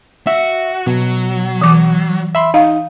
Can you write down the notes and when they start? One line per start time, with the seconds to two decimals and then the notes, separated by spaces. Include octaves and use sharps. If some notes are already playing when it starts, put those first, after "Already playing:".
0.27 F#4 E5
0.87 B2 F#3
1.61 E3 D6
2.35 E5 B5 C6
2.54 D#4 F5